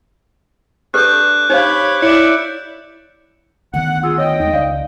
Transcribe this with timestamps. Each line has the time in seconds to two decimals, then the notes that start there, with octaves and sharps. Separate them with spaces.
0.94 D4 G4 A4 B4 F#6 G6
1.50 D#4 G4 C5 C#5 F5 B5
2.02 E4 C#5 D5 E5 C#7
3.74 D2 D#3 B3 F#5
4.04 F4 G#4 E6
4.18 C#5 D#5 G5
4.40 D#2 G#3 D#4
4.53 C#2 D5 F5